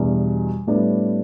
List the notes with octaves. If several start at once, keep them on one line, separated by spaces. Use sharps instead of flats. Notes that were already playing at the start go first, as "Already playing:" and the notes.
Already playing: E2 B2 G3 D4
A2 G3 B3 D4